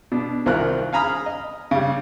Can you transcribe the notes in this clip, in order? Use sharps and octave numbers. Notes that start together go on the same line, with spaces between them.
B2 D4
C2 D#3 C4 F4 A#4 F#6
F5 G#5 A#5 B5 D#6 F6
D#5
C#3 G3